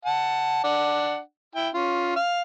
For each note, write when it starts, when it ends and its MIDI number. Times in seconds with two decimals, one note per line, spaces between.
0.05 0.64 78
0.05 0.64 81
0.64 1.19 62
0.64 1.19 78
1.55 1.69 64
1.55 1.69 79
1.74 2.15 61
1.74 2.15 65
2.16 2.41 77